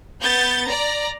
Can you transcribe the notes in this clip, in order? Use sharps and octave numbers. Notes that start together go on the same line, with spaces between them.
B3 G6 A6
D5 A#5